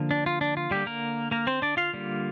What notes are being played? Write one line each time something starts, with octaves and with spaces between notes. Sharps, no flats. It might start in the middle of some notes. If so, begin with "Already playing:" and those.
Already playing: D3 F3 A#3
D4
F4
D4
F4
D3 G3 A#3 G4
A#3 A#4
A#3 A#4
C4 C5
D4 D5
F4 F5
D3 G3 A#3